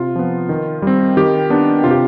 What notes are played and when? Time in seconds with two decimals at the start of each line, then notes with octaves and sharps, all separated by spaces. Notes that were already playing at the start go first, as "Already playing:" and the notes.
Already playing: C3 F4
0.16 F3 B3
0.49 D#3
0.82 G3 C4
1.17 D#3 G4
1.50 B3 D4
1.84 C3 F4
1.91 G4